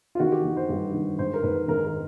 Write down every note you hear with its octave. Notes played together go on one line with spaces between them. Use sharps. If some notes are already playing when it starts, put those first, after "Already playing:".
F4
D#3 F#4
G4
D#3
C5
G2
D#3
G#2 C5
A#4
G#2 B4
D#3 A#4
A#4